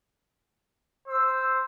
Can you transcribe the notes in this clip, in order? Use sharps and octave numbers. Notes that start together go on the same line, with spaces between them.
C5 E6